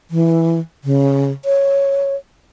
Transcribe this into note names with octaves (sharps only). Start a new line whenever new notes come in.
E3
C#3
C#5